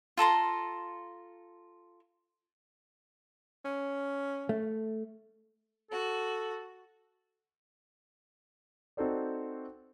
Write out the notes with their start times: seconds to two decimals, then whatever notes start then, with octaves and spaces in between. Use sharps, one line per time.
0.17 F4 A4 A#5 C6
3.65 C#4
4.49 A3
5.91 F#4 A4
8.97 C4 D#4 F#4 A4 C5 D5